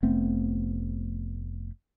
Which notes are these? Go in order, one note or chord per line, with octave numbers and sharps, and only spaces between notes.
F1 A3 B3 C4